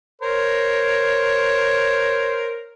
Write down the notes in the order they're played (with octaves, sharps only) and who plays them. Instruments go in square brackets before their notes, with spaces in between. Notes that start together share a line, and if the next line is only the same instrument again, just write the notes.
[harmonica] A#4 C5 C#5